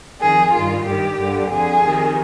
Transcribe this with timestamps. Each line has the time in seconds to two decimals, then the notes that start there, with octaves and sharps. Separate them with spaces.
0.20 F2 D#3 G#4
0.52 G2 D#3 F4
0.85 G2 D#3 G4
1.17 G2 D3
1.50 F2 D3 G#4
1.82 F2 C3 D#3